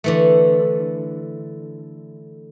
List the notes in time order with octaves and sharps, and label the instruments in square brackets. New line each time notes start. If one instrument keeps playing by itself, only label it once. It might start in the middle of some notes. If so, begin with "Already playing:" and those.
[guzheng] D3 E3 A3